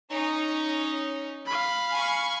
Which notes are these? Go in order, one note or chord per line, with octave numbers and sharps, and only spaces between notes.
C#4 D#4 C#5
F5 B5
G#5 C#6